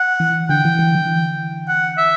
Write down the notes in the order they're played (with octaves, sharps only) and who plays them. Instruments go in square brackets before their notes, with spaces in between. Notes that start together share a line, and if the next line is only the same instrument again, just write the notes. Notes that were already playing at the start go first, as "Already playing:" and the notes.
Already playing: [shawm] F#5
[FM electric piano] E3
[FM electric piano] D3 [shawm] G5
[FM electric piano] E3
E3
E3
[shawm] F#5
E5